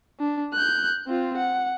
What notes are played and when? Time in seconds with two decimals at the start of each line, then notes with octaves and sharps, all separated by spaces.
0.20 D4
0.53 F#6 G6
1.07 C4 F4
1.37 F#5